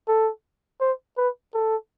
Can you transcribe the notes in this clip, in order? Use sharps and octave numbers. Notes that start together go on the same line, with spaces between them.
A4
C5
B4
A4